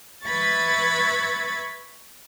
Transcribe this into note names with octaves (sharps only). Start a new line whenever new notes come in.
B4 E5 B5 C#6 G#6 A6